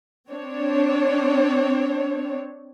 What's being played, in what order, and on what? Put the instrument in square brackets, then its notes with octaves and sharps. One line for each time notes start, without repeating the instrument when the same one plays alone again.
[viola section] C4 D4 C#5